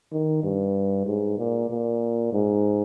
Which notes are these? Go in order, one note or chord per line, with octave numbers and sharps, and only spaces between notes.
D#3
G2
G#2
A#2
A#2
G#2